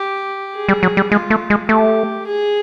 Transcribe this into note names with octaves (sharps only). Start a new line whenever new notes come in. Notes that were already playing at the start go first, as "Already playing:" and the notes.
Already playing: G4
G#4
G3
F#3
G3
G#3 F4
A3
G#3
A3 G4
G#4